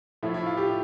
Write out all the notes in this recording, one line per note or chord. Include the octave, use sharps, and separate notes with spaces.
A2 F3 A3 E4
E4
F4
G4